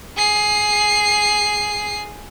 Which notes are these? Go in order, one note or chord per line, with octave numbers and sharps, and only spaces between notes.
G#4 C7